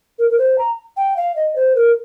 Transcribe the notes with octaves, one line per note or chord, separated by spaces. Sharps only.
A#4
A#4
C5
A#5
G5
F5
D#5
C5
A#4